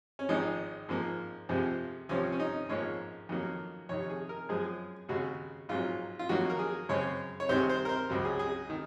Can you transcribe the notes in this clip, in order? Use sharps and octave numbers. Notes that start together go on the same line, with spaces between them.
C#4
G#1 G#2 F3 D#4
G#2 F3 A#3
F2 C3 F3 G#3 C4
C2 C3 F3 C4 C#4
C#4
D#4
A#1 G#2 F3 A#3 C#5
F2 D#3 F#3 A#3
F2 C3 D#3 C#5
G#4
A#4
F#2 F3 G#3 C4 G#4
D#2 C#3 G#3 F#4
A#1 G#2 F#3 F4
F4
F2 D#3 F#3 A#3 F#4
A#4
G#4
F#2 C#3 G#3 C4 C#5
C#5
C2 C3 D#3 G#3 C4 C5
C5
A#4
C5
C#2 C#3 F#3 C4
G#4
G#4
D#3